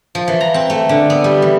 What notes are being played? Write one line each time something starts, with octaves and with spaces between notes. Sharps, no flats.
F3
E3
A#5
C4
A3
D3
B3
G3
E3